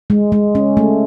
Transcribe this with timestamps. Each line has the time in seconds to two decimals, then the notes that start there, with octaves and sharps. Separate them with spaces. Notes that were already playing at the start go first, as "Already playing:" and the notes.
0.10 G#3
0.32 G#3
0.55 C#4
0.77 A3